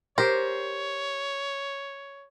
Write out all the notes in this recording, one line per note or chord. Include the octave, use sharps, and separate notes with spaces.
G4 A#4 C5 C#5